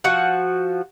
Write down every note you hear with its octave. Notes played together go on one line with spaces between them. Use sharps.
F3 F#4 F#5